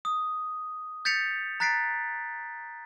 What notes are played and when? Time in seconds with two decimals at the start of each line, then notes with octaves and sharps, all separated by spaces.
0.05 D#6
1.05 G6 A6 B6 C#7 F7
1.60 A#5 F#6 A6 B6 C7 D7